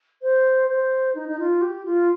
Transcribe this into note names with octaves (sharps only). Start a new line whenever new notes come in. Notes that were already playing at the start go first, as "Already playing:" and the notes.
C5
C5
D#4
D#4
F4
G4
F4